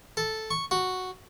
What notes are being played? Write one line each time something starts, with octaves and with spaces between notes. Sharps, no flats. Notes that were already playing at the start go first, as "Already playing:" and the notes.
A4
C#6
F#4